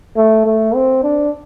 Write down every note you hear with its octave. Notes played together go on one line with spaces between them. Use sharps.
A3
A3
C4
D4